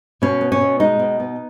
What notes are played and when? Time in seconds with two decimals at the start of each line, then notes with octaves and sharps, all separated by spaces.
0.22 B2 C#4
0.41 B3
0.52 C#4
0.61 B2
0.80 G#3 D#4
1.00 B2
1.20 B3